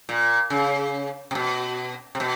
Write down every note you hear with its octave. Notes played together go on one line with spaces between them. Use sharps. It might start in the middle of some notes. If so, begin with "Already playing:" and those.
A#2
C#3
C3
B2
C3
B2